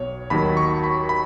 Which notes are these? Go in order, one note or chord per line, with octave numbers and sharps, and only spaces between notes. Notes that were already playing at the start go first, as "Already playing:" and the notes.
Already playing: B1 B2 C#5
D#2 D#3 F#3 B5
C#6
B5
B5